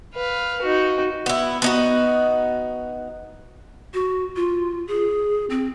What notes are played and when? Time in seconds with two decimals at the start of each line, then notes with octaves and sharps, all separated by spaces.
0.15 B4 F5
0.62 D#4 F#4
1.26 B3 E4
1.62 B3 D#4 F#4
3.94 F#4
4.36 F4
4.87 G#4
5.50 C4